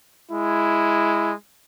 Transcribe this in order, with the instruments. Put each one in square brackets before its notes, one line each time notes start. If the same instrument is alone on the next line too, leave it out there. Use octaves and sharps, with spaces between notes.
[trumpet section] G#3 E4